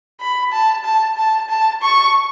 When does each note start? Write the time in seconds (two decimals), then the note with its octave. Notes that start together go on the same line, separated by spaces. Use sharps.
0.21 B5
0.53 A5
0.85 A5
1.18 A5
1.50 A5
1.83 C#6